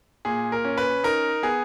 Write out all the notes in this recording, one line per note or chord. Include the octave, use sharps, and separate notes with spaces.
A#2 G#4
A#4
C#4
B4
D#4 A#4
B3 G#4